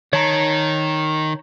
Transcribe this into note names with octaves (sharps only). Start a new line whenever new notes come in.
D#3 C#5 A5 A#5